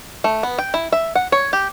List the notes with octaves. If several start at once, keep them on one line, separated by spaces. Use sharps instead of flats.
A3
B3
G5
E4
E5
F#5
C#5
G4